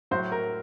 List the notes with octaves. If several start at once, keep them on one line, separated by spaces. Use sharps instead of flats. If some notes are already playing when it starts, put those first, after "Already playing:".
A2 F#3 C5
A#4